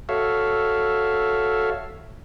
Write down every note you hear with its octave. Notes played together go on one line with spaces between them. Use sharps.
F#4 A4 C#5 E5 F5